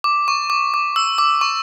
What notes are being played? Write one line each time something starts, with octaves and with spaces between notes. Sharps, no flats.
D6
C#6
D6
D6
E6
D6
C#6